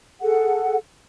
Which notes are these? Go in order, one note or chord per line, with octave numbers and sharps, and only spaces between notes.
G#4 A4 F#5